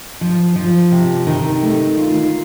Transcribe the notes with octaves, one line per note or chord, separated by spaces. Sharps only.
F3
F3
C3
D#3
A3
F4